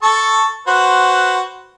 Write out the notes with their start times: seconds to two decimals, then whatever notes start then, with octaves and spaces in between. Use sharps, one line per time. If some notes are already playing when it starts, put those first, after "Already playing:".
0.03 A4 A5 C#6
0.67 F#4 B4 C5